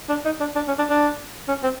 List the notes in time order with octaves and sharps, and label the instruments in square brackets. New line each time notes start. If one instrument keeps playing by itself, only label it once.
[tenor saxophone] D4
D#4
D4
D4
C#4
D4
D4
C#4
C4